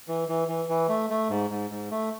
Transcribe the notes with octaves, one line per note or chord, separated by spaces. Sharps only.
E3
E3
E3
E3
A3
A3
G#2
G#2
G#2
A3